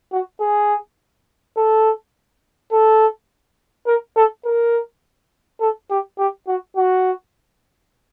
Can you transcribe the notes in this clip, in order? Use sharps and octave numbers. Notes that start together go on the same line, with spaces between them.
F#4
G#4
A4
A4
A#4
A4
A#4
A4
G4
G4
F#4
F#4